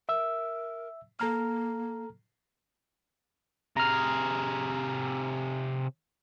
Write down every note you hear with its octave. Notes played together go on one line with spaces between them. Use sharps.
A#4 E5 E6
A#3 A4 A#5 F6
C3 G#4 A#5 F6